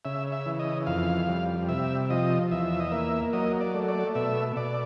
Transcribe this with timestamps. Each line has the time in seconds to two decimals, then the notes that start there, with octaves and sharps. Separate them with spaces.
0.05 C#3 E5
0.32 E5
0.46 E3
0.59 D#5
0.87 F2 F5
1.28 G3
1.69 C3 E5
2.10 F3 D#5
2.51 E2 E5
2.80 D#5
2.92 A#3 E5
3.33 F#3 D#5
3.60 D5
3.75 A3
3.88 D5
4.15 B2 E5
4.56 B2 D5